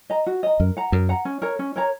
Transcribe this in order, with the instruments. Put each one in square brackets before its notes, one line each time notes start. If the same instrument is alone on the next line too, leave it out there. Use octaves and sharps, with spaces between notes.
[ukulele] D#5 A#5
F#4
D#5 A#5
[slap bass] F#2 [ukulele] A#4
[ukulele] F#5 A#5
[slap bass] F#2 [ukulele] A#4
[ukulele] F#5 A#5
C#4
A#4 C#5 A#5
C#4
A#4 C#5 A#5